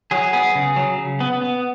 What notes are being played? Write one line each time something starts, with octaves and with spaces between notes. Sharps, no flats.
F#3 G#4
B3 G#4
C#3
F#3
C#3
B3
B3